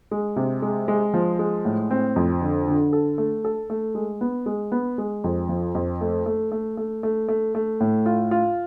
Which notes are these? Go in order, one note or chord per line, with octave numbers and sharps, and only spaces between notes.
G#3
C3
G#3
G#3
F3
G#3
A2
C4
F2
D3
D3
A4
A3
A4
A3
G#3
B3
G#3
B3
G#3
F2
F3
F2
A3
A3
A3
A3
A3
A3
A3
A2
F4
F4